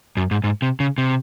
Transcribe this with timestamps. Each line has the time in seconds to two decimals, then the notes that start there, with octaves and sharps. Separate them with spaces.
0.17 F#2
0.31 G#2
0.44 G#2
0.62 C3
0.80 C#3
0.98 C3